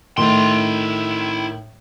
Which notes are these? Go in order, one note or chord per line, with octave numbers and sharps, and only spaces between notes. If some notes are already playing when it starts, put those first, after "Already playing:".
A2 D#3 A3 E4 C6